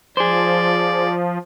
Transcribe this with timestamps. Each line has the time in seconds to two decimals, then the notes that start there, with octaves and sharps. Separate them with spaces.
0.17 F3 G#4 C5 D5